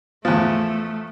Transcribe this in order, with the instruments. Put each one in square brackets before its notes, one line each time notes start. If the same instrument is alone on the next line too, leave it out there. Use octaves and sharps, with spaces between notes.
[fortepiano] E2 F3 [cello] A3